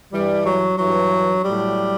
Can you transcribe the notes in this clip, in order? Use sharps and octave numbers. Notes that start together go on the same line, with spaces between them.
G2 E3 G3
F#3
G2 E3 F#3
A2 F#3 G3